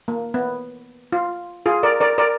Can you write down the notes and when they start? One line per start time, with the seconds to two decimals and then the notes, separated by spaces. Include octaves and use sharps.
0.08 A#3
0.34 B3
1.12 F4
1.66 F4 G#4
1.83 A#4 D5
2.01 A#4 D5
2.18 A#4 D5